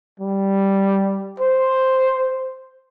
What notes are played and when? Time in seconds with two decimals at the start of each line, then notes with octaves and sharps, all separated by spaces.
0.20 G3
1.40 C5